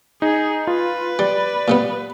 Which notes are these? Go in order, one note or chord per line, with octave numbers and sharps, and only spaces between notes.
D#4 G#4
F4 B4
G3 D5
A#2 G3 B3